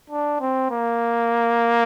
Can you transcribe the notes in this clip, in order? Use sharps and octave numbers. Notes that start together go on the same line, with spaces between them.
D4
C4
A#3